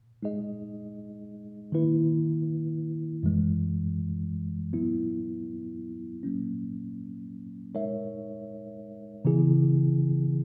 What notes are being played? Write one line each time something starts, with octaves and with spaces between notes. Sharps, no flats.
G#3 D#4 G#4 D#5
D#3 A#3 E4 B4
F#2 E3 G#3
F#3 B3 E4
F#3 A#3 C#4
G#3 D#4 A#4 C#5 E5
C#3 E3 B3 E4 G#4